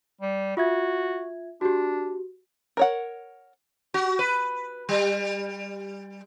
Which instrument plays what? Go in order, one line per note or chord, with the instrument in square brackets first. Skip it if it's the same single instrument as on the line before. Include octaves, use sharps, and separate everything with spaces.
[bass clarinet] G3
[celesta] F4 E5 G#6 [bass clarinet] F#4
[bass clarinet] D4 [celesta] F#4 G4
[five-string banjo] A#4 C#5 F#5
[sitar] F#4
B4
G3